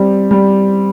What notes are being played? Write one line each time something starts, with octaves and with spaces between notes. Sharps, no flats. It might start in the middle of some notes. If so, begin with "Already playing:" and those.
Already playing: G3 C4
G3